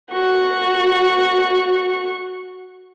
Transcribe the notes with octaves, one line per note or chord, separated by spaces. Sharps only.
F#4 C#6